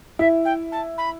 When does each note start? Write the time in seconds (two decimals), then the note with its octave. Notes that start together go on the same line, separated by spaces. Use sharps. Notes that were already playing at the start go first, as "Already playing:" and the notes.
0.19 E4 E5
0.45 G5
0.72 A5
0.98 B5